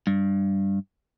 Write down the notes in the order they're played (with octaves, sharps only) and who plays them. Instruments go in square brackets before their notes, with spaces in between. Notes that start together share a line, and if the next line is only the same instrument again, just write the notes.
[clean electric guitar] G2